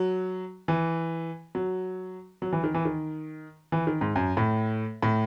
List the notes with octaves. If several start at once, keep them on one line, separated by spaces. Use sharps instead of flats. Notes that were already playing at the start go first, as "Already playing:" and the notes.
Already playing: F#3
E3
F#3
F#3
E3
D#3
E3
D#3
E3
D#3
G#2
F#2
A2
A2